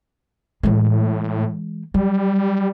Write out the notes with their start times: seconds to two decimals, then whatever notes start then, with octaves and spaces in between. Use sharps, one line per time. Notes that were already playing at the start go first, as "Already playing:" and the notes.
0.63 A2 E3 G#3
1.94 F#3 G3